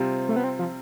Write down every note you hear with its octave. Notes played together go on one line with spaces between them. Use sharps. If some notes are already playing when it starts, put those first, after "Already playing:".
Already playing: C3 G3 C4 F4
A3
B3
C4
F3